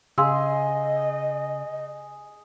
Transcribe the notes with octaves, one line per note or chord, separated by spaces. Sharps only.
C#3 G#4 D#5 F5 C6 E6